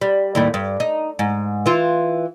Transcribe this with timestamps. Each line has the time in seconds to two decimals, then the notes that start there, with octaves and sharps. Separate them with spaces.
0.01 G3
0.35 D#2 A2 G3
0.54 G2
0.80 D#4
1.19 G#2
1.66 E3 F4